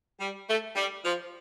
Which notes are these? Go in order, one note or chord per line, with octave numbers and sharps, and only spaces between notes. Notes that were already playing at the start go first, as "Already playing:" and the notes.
G3
A3
G3
F3